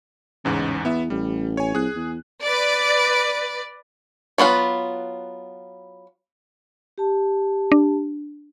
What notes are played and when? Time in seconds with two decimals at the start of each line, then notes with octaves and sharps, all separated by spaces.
0.45 A1 E2 G#2 C#3
0.85 E2 B3 E5
1.10 A1 G3
1.57 C#5 G#5
1.75 C2 G#4 F#6
1.96 E2
2.43 B4 D5
4.38 F#3 B3 F4 B4
6.98 G4 A5
7.72 D4